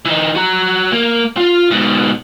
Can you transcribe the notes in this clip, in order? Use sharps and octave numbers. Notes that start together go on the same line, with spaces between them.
E3 D#4
F#4 A#5
A#3
F4
G#2 B2